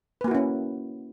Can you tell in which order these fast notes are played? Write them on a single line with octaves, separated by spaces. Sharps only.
B4 A#3 F#4 E4 C#4